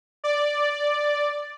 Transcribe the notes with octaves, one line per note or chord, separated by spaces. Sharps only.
D5